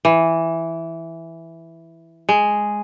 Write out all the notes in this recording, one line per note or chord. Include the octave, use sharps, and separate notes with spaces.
E3
G#3